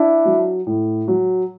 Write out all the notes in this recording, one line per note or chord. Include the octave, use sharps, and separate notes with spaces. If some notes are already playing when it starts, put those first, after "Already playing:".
Already playing: D4 E4
F#3
A2
F#3